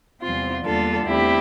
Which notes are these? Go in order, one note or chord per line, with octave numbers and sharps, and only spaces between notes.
E2 C3 E3 G3 C4 F4
E2 D3 G3 A#3 D4 F4 A4
E2 D3 A3 C4 E4 G4